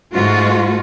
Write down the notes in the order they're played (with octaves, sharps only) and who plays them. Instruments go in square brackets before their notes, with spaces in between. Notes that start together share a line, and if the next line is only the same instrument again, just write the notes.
[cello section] G#2 A3 F4 F#4